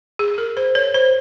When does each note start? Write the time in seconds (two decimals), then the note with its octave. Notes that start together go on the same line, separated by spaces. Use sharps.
0.19 G#4
0.38 A#4
0.57 C5
0.75 C#5
0.94 C5